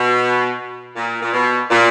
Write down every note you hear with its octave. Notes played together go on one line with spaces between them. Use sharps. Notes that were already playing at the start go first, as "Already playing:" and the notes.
Already playing: B2
A#2
A#2
B2
A#2